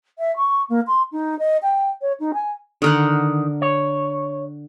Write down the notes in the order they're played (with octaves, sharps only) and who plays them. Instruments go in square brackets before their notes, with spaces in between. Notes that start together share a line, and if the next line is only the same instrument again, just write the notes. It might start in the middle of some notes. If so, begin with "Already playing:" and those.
[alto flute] E5
C#6
A#3
C6
D#4
D#5
G5
C#5
D#4
G#5
[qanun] D3 A#4 F#5 [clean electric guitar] D#3
[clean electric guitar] C#5